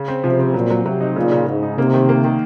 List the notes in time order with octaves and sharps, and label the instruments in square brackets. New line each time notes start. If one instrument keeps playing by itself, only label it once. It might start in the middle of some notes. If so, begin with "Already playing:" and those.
Already playing: [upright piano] C#3
C4
[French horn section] C3 [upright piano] F3
[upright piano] C4
[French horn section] A#2 [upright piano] F#3
[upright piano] F#3
[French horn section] C3 [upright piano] F#3
[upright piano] D#4
[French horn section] A#2 [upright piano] C#3
[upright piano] C#3
[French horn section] G#2 [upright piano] C#3
[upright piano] D#4
[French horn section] C3 [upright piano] A#3
[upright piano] D#3
A#3
D#3